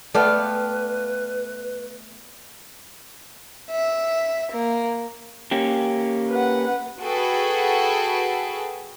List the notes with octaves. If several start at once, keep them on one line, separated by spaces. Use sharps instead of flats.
A3 B3 B4 D5 F5 G5
E5
A#3
A#3 C#4 G4
B4 F#5
F#4 G#4 A4 B4 G5